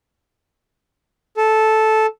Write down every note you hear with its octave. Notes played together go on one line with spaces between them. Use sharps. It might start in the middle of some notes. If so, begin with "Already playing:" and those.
A4